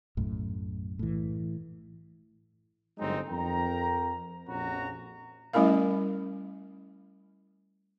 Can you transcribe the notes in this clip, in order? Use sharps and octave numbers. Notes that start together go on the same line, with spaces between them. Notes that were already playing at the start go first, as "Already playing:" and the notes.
B1 F#2 A2
A2 E3
G1 F#3 G#3 C4 D#4
F2 A#4 G5 A#5
A#1 F2 C#4 F#4 A#5
G3 A3 C#4 E4 A#4 F5